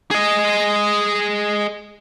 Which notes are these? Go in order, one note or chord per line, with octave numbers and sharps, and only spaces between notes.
G#4 D#5